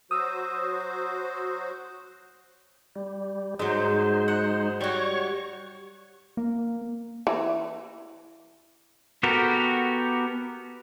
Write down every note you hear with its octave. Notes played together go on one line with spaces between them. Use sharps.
F#3 F#4 C5 D#6 E6
G3
G#2 F#3 G#3 D#4 C5
F#5
G3 F#4 C#5 C#6
A#3
E3
B3 F#4 G4 A4 A#4